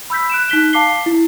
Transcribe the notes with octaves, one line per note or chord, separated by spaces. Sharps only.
B5 E6 G6 B6
F#6 D7 E7
D#4 F#6 B6 G7
F5 A5 D6 B6 C7 G7
E4